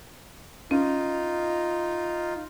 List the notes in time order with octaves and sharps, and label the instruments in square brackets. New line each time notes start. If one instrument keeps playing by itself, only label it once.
[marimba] C#4 [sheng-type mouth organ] D#4 F4